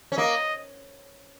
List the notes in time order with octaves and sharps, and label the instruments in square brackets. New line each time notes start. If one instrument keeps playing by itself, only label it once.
[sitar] C#4
[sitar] A#3 [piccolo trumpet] D#5